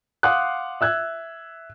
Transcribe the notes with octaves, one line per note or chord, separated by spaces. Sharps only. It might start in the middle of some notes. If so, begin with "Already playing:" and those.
F5 F#5 C6 D6 D#6 F#6
E5 E6 F#6 G#6